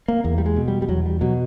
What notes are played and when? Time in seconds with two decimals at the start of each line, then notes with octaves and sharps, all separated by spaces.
0.08 A#3
0.24 E2 A#3
0.38 G3
0.46 G#3
0.56 B2
0.68 G3
0.82 G3
0.88 E2 F#3
1.06 G3
1.21 B2 F#3